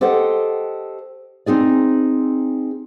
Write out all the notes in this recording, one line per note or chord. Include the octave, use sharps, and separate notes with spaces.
G4 A4 C5 D#5 F#5 G5
C4 D#4 G#4 D5